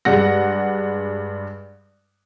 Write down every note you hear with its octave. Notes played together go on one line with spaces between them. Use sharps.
G2 G#3 F#5 A#6